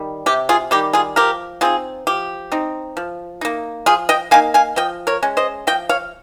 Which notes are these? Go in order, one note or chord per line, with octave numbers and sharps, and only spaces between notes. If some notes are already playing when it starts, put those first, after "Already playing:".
Already playing: D#3 G3
C3 G4
F4 G#4
D#3 G3 G4
F4 G#4
F3 G4 A#4
C4 D#4 F4 G#4
F3 G4
C4 D#4
F3
A#3 D#4
F3 F4 G#4
D#5 G5
A#3 D#4 F5 G#5
F5 G#5
F3 D#5 G5
A#4 C#5
G#3 C#4
C5 D#5
F3 D#5 G5
C#5 F5